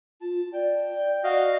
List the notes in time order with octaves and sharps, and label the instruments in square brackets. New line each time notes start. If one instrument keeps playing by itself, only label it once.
[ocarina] F4 [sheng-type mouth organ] A5
[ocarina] D5 [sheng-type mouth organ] G5
[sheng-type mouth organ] F#4 D#5 F5 [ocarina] D5